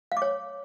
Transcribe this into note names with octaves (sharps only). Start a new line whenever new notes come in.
F5
D6
C#5